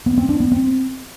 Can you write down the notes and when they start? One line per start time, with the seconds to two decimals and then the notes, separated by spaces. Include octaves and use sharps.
0.06 B3
0.18 C4
0.29 D4
0.40 B3
0.52 C4